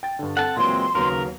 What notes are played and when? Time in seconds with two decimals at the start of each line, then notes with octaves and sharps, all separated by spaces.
0.03 G5 A6
0.19 G2 D3
0.37 C4 A4 F#5 A5
0.57 A#2 E3 F#3 G#3 C4 C6
0.95 D#2 C#3 F#3 B3 A#4